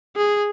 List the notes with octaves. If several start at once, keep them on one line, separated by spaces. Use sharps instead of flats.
G#4